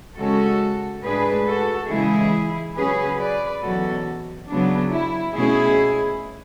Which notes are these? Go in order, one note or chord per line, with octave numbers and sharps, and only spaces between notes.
C#3 G#3 C#4 F#4 A4
A2 G#3 D4 G#4 B4
F#4 A4
C#3 E3 G#3 E4 G#4
C#3 F#3 C#4 G#4 B4
B4 D5
E2 B2 F#3 C#4 F#4 A4
C#3 F#3 B3 D4
E4
B2 A3 C#4 E4 G#4